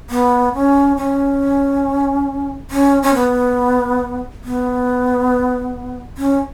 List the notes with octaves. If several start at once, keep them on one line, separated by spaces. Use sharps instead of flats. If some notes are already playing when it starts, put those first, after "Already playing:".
B3
C#4
C#4
C#4
C#4
B3
B3
C#4